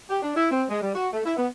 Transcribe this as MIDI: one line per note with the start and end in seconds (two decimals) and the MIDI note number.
0.09 0.18 67
0.23 0.32 62
0.36 0.50 64
0.51 0.63 60
0.69 0.80 56
0.82 0.94 55
0.94 1.08 66
1.13 1.20 57
1.25 1.34 64
1.37 1.47 59